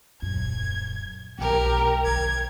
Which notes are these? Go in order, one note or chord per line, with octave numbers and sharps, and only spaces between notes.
D#1 F#2 G#6
B1 B3 G4 A#4
D3 G#6